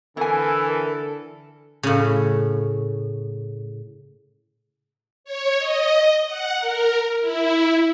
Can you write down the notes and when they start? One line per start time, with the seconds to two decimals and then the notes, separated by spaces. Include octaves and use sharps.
0.17 D3 E3 E4 A4 A#4 G#5
1.83 A2 C#3
5.24 C#5
5.58 D#5
6.26 F#5
6.58 A#4
7.21 E4